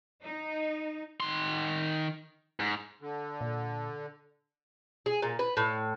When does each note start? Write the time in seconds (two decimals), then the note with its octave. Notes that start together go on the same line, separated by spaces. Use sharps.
0.23 D#4
1.20 D#3 C6
2.60 G#2
3.01 D3
3.41 A#2
5.06 G#4
5.22 A#2
5.39 B4
5.57 A2